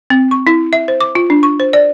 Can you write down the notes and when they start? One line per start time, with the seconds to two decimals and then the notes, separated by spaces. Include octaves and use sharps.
0.10 C4
0.31 C#6
0.47 E4
0.73 E5
0.88 C5
1.01 D6
1.15 F4
1.30 D4
1.43 C#6
1.60 C5
1.73 D5